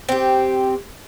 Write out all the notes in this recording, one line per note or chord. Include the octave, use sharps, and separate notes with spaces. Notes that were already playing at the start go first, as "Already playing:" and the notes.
C4 G4